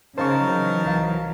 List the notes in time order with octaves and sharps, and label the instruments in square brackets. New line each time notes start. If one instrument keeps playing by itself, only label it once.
[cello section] C#3 [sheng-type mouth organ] D#4 A#4 A5 [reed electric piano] C5 F5 C#6
[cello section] E3 F#3
[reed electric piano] C2 F5